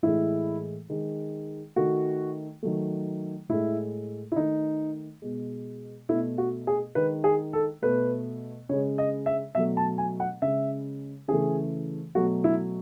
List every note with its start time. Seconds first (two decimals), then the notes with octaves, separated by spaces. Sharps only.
0.03 A2 E3 G#3 E4
0.90 D#3 G#3
1.76 D#3 A3 F#4
2.63 D#3 F#3 A3
3.49 A2 G#3 E4
4.32 E4
4.36 D#3 A3 D#4
5.22 B2 G#3
6.09 B2 A3 E4
6.38 F#4
6.67 G#4
6.95 D#3 G#3 B4
7.24 G#4
7.53 A4
7.82 B2 A3 B4
8.69 C#3 G#3 C#5
8.98 D#5
9.26 E5
9.55 B2 F#3 A3 E5
9.77 A5
9.98 G#5
10.20 F#5
10.42 C#3 G#3 E5
11.28 C#3 E3 A3 G#4
12.15 B2 F#3 A3 F#4
12.44 E4